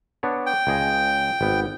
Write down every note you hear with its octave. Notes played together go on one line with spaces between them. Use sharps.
B3 D4 C#5
G5
C#2 G#4 D#5
G#1 B3